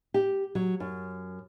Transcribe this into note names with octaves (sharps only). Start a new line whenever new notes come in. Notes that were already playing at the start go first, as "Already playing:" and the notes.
G4
F#3
F#2